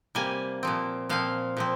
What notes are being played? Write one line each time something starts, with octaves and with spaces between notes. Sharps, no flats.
C3 G3 A#3 G#5
A#2 F3 C4
A#2 F3 C4 F5
A#2 F3 C4